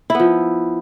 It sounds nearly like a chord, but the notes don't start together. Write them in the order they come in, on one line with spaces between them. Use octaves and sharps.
E4 B3 F3